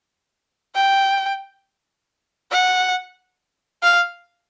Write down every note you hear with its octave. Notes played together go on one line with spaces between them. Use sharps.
G5
F#5
F5